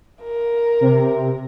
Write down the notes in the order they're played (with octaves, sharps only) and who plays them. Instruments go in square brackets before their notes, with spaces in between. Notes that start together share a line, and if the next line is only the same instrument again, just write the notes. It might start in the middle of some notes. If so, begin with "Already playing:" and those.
[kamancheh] A#4
[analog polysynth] C3